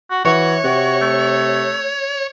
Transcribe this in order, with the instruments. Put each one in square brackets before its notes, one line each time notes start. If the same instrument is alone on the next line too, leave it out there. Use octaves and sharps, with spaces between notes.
[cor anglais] F#4
[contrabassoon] E3 [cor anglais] F#4 [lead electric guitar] C#5
[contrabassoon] C3 [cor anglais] F#4
[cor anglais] A3